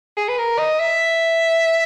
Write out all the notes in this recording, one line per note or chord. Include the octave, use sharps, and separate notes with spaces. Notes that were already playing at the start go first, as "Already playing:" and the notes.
G#4
B4
A#4
D#5
E5